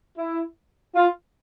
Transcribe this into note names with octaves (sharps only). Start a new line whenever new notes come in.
E4
F4